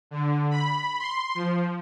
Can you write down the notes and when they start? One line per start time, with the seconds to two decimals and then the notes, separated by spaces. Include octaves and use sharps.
0.11 D3
0.51 B5
0.99 C6
1.35 F3